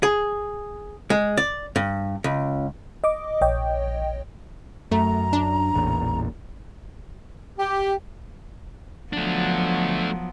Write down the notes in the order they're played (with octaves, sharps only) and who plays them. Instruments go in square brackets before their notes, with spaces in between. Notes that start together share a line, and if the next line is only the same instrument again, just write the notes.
[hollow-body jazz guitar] G#4
G#3
D5
G2
C#2
[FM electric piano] D#5 D6
A#1 C#5 D#5 G5
[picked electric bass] F#2 [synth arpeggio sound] A3 [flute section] A#5
[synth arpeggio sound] D4
[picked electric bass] A1 E2 A#2
[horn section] G4
[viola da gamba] F3 F#3 B3 [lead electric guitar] A3 D4